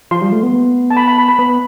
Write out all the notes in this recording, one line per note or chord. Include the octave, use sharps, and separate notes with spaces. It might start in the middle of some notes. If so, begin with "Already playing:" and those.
F3 C6
G3
A3
B3
A5
B5
B5
B5
B5
B3